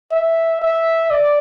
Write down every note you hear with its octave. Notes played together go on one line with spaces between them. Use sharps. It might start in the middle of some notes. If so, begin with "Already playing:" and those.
E5
E5
D5